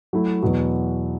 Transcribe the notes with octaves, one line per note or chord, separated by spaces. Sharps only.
F#3 A3 E4
E2 B2 F#3